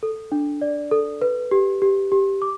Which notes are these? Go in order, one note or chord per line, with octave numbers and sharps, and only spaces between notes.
A4
D4
D5
A4
B4
G4
G4
G4
D6